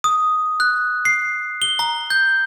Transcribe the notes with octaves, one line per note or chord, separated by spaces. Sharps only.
D#6
F#6
C7
G7
A#5
G6